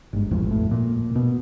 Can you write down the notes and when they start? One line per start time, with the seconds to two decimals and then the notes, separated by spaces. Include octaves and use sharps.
0.13 G1 G#2
0.31 E1 A1 F2
0.51 A2
0.71 A#2
1.16 B2